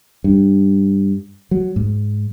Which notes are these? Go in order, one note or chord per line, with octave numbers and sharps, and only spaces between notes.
G2
F#3
G#2